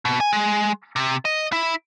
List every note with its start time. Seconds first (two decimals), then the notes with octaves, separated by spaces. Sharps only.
0.05 B2
0.20 G#5
0.33 G#3
0.96 C3
1.25 D#5
1.52 E4